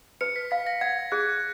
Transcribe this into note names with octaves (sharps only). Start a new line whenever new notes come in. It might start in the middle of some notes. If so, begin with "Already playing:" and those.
B4 C#7
B6
F5 B6
A#6
F#5 G#6
G#4 F#6